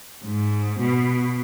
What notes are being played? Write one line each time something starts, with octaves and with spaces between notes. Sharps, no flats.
G#2
B2